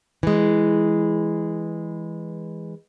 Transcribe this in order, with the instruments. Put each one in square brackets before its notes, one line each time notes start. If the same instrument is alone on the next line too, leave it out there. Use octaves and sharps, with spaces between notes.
[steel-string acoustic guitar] E3 G#3